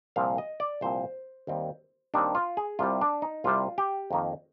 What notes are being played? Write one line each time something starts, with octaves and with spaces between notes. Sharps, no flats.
C2 A#2 F3 C4 F5
D#5
D5
C2 A#2 F3 C4 C5
D#2 D#3 G3 C4
D#2 D#3 G3 C4 D4
F4
G#4
C2 C3 G3 F4
D4
D#4
C2 C3 G3 F4
G4
F2 D#3 A#3